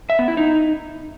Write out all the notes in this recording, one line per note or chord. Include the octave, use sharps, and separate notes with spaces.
E5
B3
E4
D#4